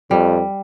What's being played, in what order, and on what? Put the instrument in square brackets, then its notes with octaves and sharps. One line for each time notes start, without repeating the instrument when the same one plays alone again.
[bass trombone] F2 [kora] G3